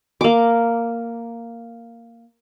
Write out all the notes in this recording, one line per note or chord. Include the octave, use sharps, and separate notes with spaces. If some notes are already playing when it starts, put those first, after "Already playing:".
A#3 D6